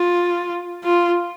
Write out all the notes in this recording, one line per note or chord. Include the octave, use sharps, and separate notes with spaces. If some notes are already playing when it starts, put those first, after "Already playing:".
Already playing: F4
F4